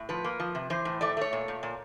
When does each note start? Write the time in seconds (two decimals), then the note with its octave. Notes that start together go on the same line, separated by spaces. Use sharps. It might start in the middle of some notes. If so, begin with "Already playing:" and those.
Already playing: A2
0.09 F3 B4
0.24 A#3
0.40 F3
0.55 C3
0.70 E3 C5
0.85 A2
1.01 A3 D5
1.17 A3 C#5
1.33 A#2
1.48 A#2
1.63 A#2